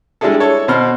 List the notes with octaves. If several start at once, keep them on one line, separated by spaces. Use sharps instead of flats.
G3 G#3 D4 E4 G#4 A4
E4 A4 C#5
B2 C5 B5 F6